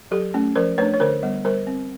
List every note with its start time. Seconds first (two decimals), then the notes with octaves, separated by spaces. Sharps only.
0.11 F#3 G4 A4
0.34 A3 C#4
0.56 F3 A#4 C5
0.78 A3 D4 B4 C#5
0.94 C#5
1.00 D3 A#4 C5
1.23 G3 B3
1.45 G3 A#4 C5
1.67 C4